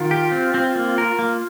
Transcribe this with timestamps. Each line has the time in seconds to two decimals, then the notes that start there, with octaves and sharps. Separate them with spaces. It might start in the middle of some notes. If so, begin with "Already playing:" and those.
Already playing: D#3 F4
0.11 G4
0.32 C4
0.54 C4
0.75 A#3
0.98 A#4
1.19 A#3 F4